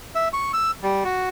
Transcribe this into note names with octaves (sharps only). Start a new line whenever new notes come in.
E5
C#6
E6
G3
F#4